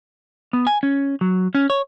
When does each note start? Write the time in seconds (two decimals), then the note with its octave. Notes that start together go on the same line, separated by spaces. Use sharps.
0.53 B3
0.67 G#5
0.83 C#4
1.21 F#3
1.55 C#4
1.70 C#5